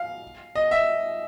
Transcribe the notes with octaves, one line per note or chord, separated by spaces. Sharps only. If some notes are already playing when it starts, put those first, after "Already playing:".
Already playing: F5
D#5
E5